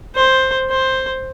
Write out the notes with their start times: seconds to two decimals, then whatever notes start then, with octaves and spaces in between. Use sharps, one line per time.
0.16 C5
0.70 C5